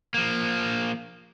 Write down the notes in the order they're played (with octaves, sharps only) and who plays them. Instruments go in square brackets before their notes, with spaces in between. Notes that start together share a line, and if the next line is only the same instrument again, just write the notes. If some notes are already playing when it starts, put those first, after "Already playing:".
[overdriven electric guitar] F3 A#3